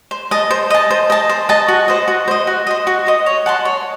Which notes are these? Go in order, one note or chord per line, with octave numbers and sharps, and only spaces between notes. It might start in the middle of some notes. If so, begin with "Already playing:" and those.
C5
D#5 A5
C5
D#5 A5
C5
D#5 A5
C5
D#5 A5
F#4
C5 D#5
F#4
C5 D#5
F#4
C5 D#5
F#4
C5 D#5
C#5
F#5 A5 C6
C#5